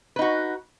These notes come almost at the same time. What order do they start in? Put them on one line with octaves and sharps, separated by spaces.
B4 D#4 F#4